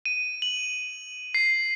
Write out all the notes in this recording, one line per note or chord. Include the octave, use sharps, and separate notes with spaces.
D#7
F#7
C7